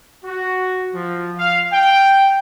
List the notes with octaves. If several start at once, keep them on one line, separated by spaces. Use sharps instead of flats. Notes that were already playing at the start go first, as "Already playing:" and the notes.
F#4
F3
F5
G5